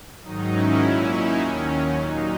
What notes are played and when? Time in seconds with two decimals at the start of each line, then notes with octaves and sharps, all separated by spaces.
0.23 G#2 D#3 F#3 D#4
0.52 C#4 E4
0.80 A#2 F#3
1.10 D#4
1.38 D#2 D#3 F#3 C#4
1.96 A#2 F#3 D#4